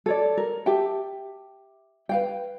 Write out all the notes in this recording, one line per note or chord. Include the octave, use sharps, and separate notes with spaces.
A4 C#5 D5
A#4
G4 E5 G5 A5
B4 F5 G5